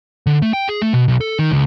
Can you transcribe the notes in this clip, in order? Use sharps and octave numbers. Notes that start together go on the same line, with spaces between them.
D3
A3
G5
G#4
A3
B2
B1
A4
D#3
C#2